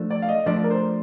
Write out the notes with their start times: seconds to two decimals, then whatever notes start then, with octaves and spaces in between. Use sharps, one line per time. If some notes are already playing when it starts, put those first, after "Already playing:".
Already playing: F3 A3 D4
0.10 D5
0.22 F5
0.29 D#5
0.46 F3 A3 D4 D5
0.64 A#4
0.71 C5